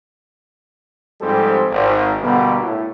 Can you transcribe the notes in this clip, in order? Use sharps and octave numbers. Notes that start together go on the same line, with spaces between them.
G#2 F3 G3 C4 G4 A4
G#1
B2 D3 G3 A#3 B3
A2